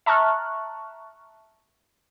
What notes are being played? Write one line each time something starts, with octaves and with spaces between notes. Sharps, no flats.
E5 A5 A#5 C#6 F6 F#6